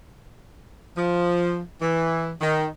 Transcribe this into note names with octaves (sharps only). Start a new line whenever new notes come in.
F3
E3
D#3